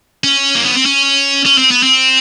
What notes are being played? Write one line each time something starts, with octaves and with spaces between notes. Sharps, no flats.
C#4
A#3
B3
C4
C#4
C#4
C4
B3
C4